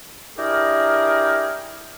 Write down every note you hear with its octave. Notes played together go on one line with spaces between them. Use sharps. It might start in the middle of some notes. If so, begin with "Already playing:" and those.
D4 E4 G4 G#4 A#4